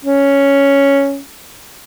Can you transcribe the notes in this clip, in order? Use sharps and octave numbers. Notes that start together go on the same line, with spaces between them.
C#4